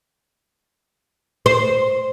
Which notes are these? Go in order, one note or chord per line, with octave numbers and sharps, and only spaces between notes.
C5